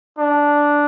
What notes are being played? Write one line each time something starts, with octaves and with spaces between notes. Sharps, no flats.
D4